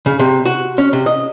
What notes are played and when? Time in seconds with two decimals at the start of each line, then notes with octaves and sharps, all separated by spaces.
0.06 C#3
0.19 C3
0.45 F#4
0.78 C#4
0.93 C3
1.06 D#5